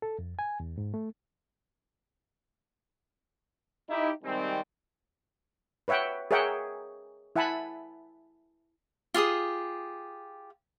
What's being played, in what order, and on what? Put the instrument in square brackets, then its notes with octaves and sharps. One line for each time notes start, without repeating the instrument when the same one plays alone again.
[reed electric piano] A4
F2
G#5
E2
G#2
A3
[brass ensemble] D#4 E4 G4
C3 D#3 G3 G#3 C4
[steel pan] B4 C#5 E5 F#5 G5
G#4 A#4 C#5 E5 F#5 G5
E4 E5 F#5 G#5 A5 B5
[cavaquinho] F4 G4 G#4 D#6